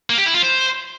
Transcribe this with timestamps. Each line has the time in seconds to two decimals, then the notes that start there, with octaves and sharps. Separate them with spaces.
0.10 A#3
0.18 G4
0.26 E4
0.34 F4
0.42 C5